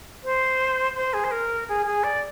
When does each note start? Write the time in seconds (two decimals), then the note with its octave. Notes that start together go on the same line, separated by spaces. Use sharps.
0.24 C5
0.95 C5
1.13 G#4
1.24 C5
1.31 A#4
1.69 G#4
1.86 G#4
2.04 D5